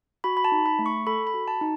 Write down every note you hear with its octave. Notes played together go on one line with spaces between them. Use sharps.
F#4 B5
B5
A5
D#4
B5
A3
C#6
A4 B5
B5
F#4
A5
D#4